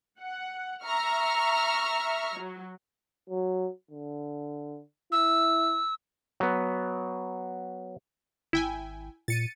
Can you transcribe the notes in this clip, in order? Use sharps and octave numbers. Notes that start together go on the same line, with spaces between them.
F#5
E5 A#5 C#6 F6
F#3
F#3
D3
E4 E6
F#3 B3
G#1 E4 G5 G#5
A#2 A6 C#7 D#7